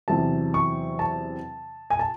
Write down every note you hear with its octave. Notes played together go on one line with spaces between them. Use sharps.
E2 C3 F#3 A5
C#6
A5
G#5
A5